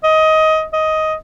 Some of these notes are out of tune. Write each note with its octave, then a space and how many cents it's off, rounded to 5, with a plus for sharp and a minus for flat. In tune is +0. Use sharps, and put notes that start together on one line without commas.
D#5 +20
D#5 +10